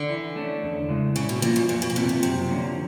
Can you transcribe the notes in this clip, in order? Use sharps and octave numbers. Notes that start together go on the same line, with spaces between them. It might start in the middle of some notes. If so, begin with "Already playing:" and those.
Already playing: D3
E3
A3 C#4
E2
C#3 E3 G#3
A2 C#3
B2
A#2 F3 A#3
F#2
F2 A#2
B2
A#2
A2 C3 D#3
A#2
F#2 C3
D3 F3 A#3 C#4